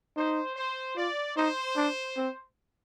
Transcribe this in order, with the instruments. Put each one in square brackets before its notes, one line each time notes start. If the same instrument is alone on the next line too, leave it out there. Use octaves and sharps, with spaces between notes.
[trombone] D#4 [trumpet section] C5
[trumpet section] C5
[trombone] F4 [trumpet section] D5
[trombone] D#4 [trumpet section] C5
[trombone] D4
C4